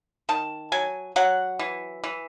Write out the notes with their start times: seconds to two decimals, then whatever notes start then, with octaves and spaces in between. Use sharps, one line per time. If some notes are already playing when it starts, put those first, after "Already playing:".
0.29 D#3 A5
0.72 F#3 G#5
1.16 F#3 F#5
1.59 E3
2.04 E3